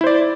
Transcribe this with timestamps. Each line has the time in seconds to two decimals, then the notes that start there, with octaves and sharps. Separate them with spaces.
0.01 E4
0.04 C5
0.07 D5